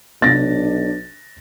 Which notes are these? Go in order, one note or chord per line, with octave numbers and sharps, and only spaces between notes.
B1 C3 B3 D4 A6 A#6